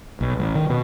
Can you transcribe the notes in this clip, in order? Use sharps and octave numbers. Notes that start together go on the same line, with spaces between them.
B1
A1
D#3
B2